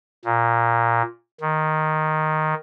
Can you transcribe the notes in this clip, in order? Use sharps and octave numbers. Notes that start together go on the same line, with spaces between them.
A#2
D#3